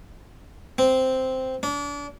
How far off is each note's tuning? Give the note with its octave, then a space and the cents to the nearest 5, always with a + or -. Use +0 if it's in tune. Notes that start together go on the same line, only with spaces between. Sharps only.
C4 -5
D4 -35